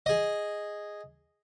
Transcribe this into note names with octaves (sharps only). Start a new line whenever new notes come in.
G#4 D#5